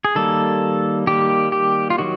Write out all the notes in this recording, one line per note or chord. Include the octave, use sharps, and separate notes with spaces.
G#4
D#3 G3 A#3 A4
D#3 G3 A#3 G4
G4
F4
D#3 F#3 F#4